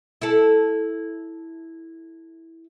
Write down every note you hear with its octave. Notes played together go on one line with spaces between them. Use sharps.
E4 A4